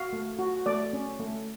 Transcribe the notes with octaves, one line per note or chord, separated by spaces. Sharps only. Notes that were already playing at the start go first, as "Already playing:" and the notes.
Already playing: F#4 F5
A3
F#4
A3 D5
C#4
A3